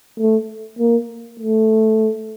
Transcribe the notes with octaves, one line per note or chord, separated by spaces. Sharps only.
A3
A#3
A3